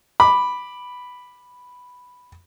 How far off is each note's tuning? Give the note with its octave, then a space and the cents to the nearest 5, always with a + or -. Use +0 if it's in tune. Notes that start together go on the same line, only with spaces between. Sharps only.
B5 +0 D6 +10